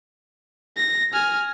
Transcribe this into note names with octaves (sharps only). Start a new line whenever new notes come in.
A#6
G#5 F6